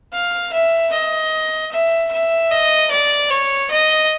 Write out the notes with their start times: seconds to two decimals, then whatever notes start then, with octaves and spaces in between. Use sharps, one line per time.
0.13 F5
0.53 E5
0.93 D#5
1.72 E5
2.12 E5
2.51 D#5
2.91 D5
3.30 C#5
3.71 D#5